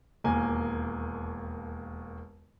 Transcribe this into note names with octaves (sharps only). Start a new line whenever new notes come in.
E1 D#2 A#3 G#5